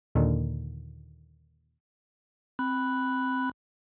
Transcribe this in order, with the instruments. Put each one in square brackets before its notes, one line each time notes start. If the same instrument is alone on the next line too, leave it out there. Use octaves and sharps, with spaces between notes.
[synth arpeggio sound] D#2 A#2 D3 D#3
[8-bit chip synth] C4 B5 F#6